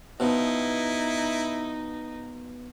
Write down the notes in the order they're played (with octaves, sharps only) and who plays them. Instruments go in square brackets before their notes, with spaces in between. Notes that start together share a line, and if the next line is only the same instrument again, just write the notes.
[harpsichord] B2 F3 [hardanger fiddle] D#4 [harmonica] E4